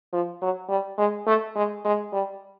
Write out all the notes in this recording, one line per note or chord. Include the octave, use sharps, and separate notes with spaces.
F3
F#3
G3
G#3
A3
G#3
G#3
G3